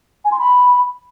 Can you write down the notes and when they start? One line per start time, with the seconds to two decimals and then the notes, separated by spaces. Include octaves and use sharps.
0.25 G#5
0.32 C6
0.39 B5